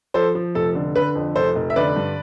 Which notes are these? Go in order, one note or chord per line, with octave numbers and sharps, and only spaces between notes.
F3 A4 C5
F3
F1 A4
D3
D3 B4
F2
F1 A4 C5
F1
E5
D3 B4 D5
G2